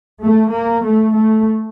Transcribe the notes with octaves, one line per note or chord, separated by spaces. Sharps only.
A3
A#3
A3
A3